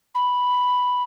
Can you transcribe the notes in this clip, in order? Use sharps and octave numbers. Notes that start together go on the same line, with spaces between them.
B5